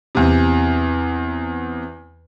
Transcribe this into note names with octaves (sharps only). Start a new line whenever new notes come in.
E2 C3